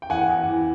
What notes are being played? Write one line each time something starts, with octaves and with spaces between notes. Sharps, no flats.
G5
E2 F#5 G#5
E2
E3